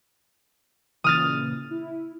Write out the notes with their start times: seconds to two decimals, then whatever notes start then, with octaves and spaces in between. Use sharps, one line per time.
1.04 A#2 C#3 E3 D#6 F6 A6
1.71 E4